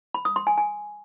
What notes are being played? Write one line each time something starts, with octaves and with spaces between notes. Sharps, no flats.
B5
D#6
C6
G#5
G#5